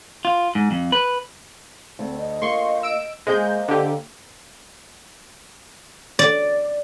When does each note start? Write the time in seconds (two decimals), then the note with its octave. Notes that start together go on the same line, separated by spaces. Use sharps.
0.25 F4
0.55 G#2
0.71 F2
0.92 B4
1.99 D2 C4
2.19 D#5
2.42 A#3 F4 C6 C#6
2.83 E6 D7
3.27 G#3 A#3 C5 D#5 G#5 G6
3.68 D3 G4
6.19 D5